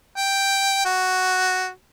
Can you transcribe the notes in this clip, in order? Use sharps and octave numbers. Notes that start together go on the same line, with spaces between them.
G5
F#4